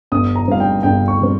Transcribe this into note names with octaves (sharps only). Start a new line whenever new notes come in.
G1 D#6
A#5
G2 G3 C4 F5
G5
G1 G5
C#6
G3 C4